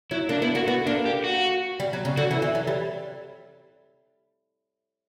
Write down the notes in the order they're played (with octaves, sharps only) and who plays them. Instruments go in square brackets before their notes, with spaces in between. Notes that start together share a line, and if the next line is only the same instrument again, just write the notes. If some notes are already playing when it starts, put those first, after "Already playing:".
[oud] F#3 [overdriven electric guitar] E4
[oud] A#3 [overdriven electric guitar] D4
[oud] B3 [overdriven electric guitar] E4
[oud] A#3 [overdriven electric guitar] F#4
[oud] B3 [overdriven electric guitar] F#4
[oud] A#3 [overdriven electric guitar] D4
[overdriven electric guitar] G4
F#4
[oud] G3
F#3
C#3
[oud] D3 [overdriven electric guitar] F#4
[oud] E3
E3
F#3
G3